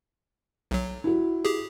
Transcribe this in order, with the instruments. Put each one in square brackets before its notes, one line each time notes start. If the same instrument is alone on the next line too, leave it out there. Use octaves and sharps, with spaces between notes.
[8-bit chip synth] B1 F#3
[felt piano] E4 F#4
[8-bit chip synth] G4 G#4